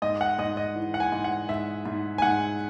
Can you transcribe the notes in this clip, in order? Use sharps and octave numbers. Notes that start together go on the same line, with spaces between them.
G#2 D#5
F#5
G#2 D#5
D#5
E3
F#5
G#5
G#2
F#5
G#2 E5
G#2
G#5
G#2 F#5